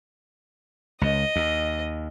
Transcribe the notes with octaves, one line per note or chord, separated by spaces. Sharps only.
C#2 D#5
D#2